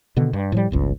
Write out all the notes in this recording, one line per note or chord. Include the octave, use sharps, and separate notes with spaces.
B2 D3 D#3 B3
G2
A2 F3 G3
D1 G1 C#2